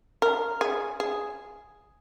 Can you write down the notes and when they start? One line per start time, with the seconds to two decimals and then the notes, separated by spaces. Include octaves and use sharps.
0.22 A#4
0.61 G#4
1.00 G#4